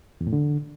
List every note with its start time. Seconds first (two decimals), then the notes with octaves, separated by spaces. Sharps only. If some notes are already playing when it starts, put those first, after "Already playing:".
0.21 E2
0.27 A2
0.33 D3